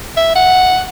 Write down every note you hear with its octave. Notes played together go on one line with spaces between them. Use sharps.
E5
F#5